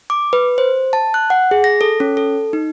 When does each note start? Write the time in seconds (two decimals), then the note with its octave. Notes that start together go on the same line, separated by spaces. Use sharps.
0.10 D6
0.33 B4
0.58 C5
0.93 A5
1.14 F#6
1.30 F#5
1.51 G#4
1.64 A#6
1.81 A4
2.00 C#4
2.17 A4
2.53 D#4